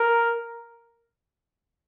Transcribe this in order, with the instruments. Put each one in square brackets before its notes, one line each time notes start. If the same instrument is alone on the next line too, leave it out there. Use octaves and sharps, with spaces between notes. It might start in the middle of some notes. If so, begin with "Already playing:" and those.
Already playing: [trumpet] A#4